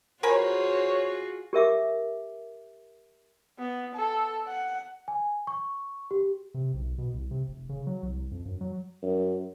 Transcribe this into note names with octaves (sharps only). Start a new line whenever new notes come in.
F4 F#4 G#4 A#4 C5 C#5 G#5 B5
G4 A#4 E5 D6
B3
A4
F#5
G#5
C#6
G4
C3
B1
B2
C2
C3
F1
C#3
F#3
C2
F2
F#2
F#3
F#2